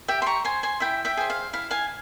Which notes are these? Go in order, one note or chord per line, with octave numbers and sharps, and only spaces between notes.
G4 E5 G5
C6
A#5 C#6
C5 G#5 C6
G#5 C6
E4 E5 G5
E5 G5
G#4 C5
F5
E4 F5
F5 G#5